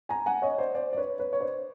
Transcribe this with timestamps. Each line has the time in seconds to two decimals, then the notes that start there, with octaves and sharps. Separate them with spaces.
0.09 G#5 A#5
0.26 F#5 G#5
0.42 C#5 D#5
0.58 C5 D5
0.75 C5 D5
0.93 D5
0.97 B4 C#5
1.19 B4 C#5
1.33 C#5
1.40 C5 D5